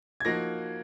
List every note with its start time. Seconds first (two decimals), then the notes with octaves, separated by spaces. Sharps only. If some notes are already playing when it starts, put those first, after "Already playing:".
0.20 G#6
0.25 F3 A#3 D#4 F#4 A#6